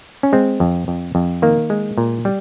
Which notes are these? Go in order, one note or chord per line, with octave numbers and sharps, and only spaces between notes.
C#4
G#3 C4
F2
F2
F2
D#3 A#3
G#3
A#2
G3